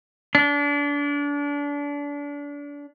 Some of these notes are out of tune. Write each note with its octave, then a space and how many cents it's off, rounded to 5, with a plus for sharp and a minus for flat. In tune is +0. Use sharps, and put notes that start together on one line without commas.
D4 -30